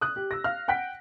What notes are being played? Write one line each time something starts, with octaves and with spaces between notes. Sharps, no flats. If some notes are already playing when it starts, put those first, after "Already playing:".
D#6 F#6
G4
E6 A#6
F5 F6
F#5 G5 F#6 B6